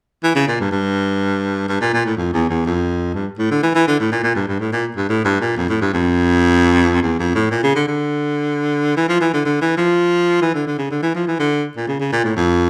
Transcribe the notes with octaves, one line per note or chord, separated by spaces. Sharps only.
E3
C#3
A#2
G2
G2
G2
A#2
A#2
A2
F2
E2
E2
F2
G2
A2
D3
E3
E3
D3
A2
A#2
A#2
G2
G2
A2
A#2
G2
A2
G2
A#2
F2
A2
G2
F2
E2
F2
A2
A#2
C#3
D3
D3
E3
F3
E3
D3
D3
E3
F3
E3
D3
D3
C#3
D3
E3
F3
E3
D3
A#2
C#3
C#3
A#2
A2
F2